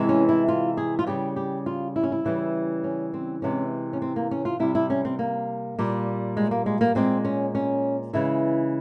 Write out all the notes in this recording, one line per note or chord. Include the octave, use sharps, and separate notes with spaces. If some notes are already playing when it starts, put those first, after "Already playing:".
Already playing: C3 E3 G#3
C#4
E4
F4
G#4
F4
C#3 G3 G4
G4
F4
E4
C#4
E4
C#3 E3 G3
C#4
C4
C3 E3 G#3 C#4
C#4
C4
A#3
C#4
F4
C3 G3 E4
E4
C#4
C4
A#3
A#2 G3
G#3
A#3
G#3
A#3
A#2 G#3 C4
C#4
C#4
C#3 E3 G#3 E4